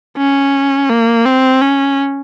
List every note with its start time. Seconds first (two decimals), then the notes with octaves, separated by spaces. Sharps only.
0.18 C#4
0.89 A#3
1.26 C4
1.62 C#4